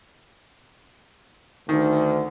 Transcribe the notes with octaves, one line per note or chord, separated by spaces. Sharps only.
D2 D#3